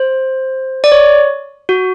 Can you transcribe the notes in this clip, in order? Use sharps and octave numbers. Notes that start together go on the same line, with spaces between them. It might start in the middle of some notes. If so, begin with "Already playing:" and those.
Already playing: C5
D5
C#5
F#4